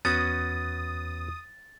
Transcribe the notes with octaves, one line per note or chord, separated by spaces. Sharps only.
E2 B3 C#4 F#4 D#6 A6